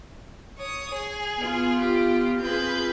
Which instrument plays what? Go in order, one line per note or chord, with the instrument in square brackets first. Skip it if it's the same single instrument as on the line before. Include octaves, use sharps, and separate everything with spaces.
[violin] C#5 D#6
G#4
[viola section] B3 F4
[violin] G4
[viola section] C4 F4 G#4 [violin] B4 G6